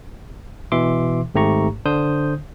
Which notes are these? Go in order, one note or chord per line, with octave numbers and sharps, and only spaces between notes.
B2 E3 E5 C6 D6
G#1 G#2 A3 G4 A#5 C#6
D3 D4 C5 D#6 G6